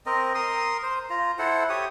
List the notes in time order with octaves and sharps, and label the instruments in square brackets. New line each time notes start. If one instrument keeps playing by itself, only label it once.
[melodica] C4 A#4 D#5
A#4 C6 D#6
C5
F4 A#5
E4 A4 C5 F#5
G4 C#5 D#6